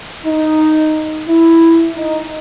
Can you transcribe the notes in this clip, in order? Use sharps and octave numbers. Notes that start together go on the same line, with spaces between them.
D#4
E4
D#4